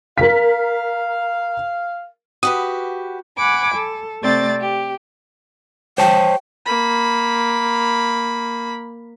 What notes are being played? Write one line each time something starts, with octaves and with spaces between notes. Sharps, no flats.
A#4 F5 B6
F#4 G4 B4 D#6
F#5 G#5 B5 D6
A4
C3 A3 C4 D5 A6
G4
C5 C#5 G5 A5
A#3 B5